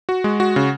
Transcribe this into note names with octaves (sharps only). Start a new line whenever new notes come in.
F#4
G#3
F#4
C#3